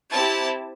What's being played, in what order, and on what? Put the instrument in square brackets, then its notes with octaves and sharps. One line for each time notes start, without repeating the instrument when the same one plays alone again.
[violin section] C4 E4 G4 A5